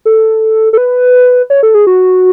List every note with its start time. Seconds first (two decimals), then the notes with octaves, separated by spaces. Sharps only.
0.05 A4
0.73 A4
0.77 B4
1.50 C#5
1.63 A4
1.74 G#4
1.87 F#4